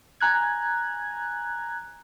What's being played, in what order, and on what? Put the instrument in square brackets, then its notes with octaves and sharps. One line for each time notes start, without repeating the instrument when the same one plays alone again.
[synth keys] G#5 A#5 F#6 G#6